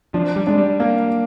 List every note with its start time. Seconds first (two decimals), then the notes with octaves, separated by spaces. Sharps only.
0.14 F3 D4
0.36 G3
0.47 G#3 D4
0.57 G3
0.80 A#3